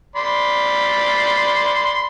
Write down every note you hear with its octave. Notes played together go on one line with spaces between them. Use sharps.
D5 B5 C6